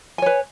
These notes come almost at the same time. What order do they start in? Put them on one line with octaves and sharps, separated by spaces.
G#5 C#5 B4